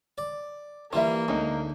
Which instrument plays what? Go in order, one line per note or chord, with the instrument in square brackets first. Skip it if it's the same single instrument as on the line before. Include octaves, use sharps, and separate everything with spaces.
[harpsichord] D5
[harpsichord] E3 G3 [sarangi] A#3 [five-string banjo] F4 E5
[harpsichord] D2 [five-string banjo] G#3 C#4 D#4